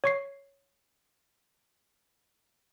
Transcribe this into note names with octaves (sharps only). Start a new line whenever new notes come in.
C#5 C#6 C7